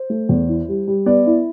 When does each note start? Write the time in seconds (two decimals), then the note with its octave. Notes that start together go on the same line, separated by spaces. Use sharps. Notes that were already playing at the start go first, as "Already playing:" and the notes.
Already playing: C5
0.10 A3
0.29 E2
0.49 E4
0.68 G3
0.87 G3
1.06 B3 D5
1.26 E4